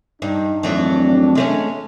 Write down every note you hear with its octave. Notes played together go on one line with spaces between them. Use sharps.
G2 D4 D#4
G#1 F2 E3 F#3 A3 D4
G#3 A3 C#4